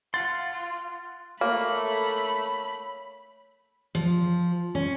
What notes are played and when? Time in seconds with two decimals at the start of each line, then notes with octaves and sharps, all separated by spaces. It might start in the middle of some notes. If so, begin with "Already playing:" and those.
0.14 F4 F#5 C6 A6
1.41 A3 A#3 C#5 B5
3.95 F3
4.75 C#4